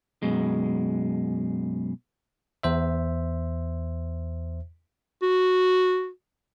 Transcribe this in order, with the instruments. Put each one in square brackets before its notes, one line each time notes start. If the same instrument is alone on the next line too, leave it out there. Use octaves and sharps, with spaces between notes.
[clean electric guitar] F#2 B2 G#3
[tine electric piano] E2 C5 E5
[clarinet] F#4